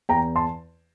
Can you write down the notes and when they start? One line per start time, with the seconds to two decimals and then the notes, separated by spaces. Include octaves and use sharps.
0.09 E2 G5 A#5
0.36 A5 C6